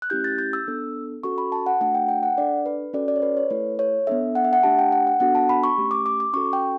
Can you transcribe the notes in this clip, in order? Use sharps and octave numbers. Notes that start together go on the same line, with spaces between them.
F#6
A3 C#4 E4 G4 G6
A6
G6
E6
B3 D4 A4
C#4 F#4 A4 C#6
B5
A5
F#5
A3 D4 F#4 A4 F#5
G5
G5
F#5
D4 A4 D5
B4
C#4 F#4 A4 D5
D5
C#5
B4
C#5
A3 E4 A4 B4
C#5
B3 D4 A4 E5
F#5
E5
F#5
A3 D4 G4 A5
G5
F#5
F#5
B3 D4 F#4 A4 F#5
A5
B5
C#6
A3 C#4 G4
D6
D6
D6
C#4 F#4 A4 C#6
G5